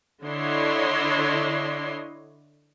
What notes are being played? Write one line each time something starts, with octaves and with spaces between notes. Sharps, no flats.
D3 D4 E4 C#5 D#5 C6